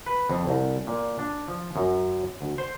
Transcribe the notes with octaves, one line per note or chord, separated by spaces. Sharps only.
B4
F2
C2
A#2
D4
F3
F#2
D2
C5